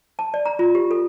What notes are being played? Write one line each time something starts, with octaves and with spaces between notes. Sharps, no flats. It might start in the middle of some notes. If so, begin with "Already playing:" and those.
A5
D5
A#5
F4
G4
A4